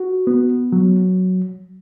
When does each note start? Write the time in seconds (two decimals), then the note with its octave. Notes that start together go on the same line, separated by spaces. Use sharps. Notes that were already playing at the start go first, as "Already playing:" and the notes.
Already playing: F#4
0.27 B3
0.72 F#3